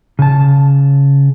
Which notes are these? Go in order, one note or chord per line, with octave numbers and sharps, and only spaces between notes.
C#3 A5